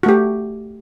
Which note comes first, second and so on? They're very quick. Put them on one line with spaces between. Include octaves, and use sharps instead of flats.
F#4 A3 G4